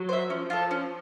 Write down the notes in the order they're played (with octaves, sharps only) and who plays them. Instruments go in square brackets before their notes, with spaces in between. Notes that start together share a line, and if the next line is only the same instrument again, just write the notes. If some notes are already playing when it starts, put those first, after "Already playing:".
Already playing: [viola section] F#3
[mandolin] C5 E5
[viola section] F3 [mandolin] C#4
[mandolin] F4 A4
C#4